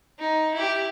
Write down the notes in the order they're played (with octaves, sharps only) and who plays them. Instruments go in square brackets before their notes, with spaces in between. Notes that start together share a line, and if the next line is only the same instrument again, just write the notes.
[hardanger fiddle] D#4
E4 G4